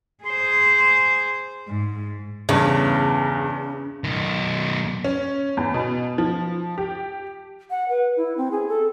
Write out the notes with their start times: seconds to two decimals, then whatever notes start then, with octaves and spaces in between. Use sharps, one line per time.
0.24 G#4 C5
1.68 G#2
2.49 E2 G2 C#3
4.04 B1 D#3
5.04 C#4
5.57 E2
5.74 B2
6.18 F3
6.78 G4
7.70 F#5
7.89 B4
8.17 E4
8.37 C4
8.51 G#4
8.68 A4